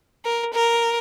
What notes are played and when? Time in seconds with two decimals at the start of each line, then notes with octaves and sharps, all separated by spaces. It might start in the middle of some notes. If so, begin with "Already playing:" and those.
0.25 A#4
0.53 A#4